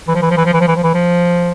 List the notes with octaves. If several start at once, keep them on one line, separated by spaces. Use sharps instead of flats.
E3
F3
E3
F3
E3
F3
E3
F3
E3
F3
E3
F3